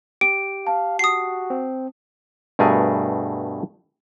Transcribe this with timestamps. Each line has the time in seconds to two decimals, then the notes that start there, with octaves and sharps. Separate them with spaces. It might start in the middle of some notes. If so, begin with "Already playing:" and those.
0.21 G4 D7
0.67 F5 A5
0.99 F#4 D#6 C7
1.50 C4
2.59 G2 B2 A3 G#4 A#4 G#5